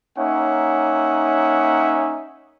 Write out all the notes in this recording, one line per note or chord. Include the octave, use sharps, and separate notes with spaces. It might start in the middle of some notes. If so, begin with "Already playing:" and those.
A#3 C#4 D#4 C#5 E5 F#5